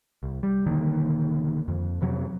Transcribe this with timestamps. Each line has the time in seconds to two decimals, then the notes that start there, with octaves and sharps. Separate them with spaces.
0.23 C2
0.43 G3
0.67 E1 D3 D#3 A#3
1.68 F2
2.01 F2 C3 F#3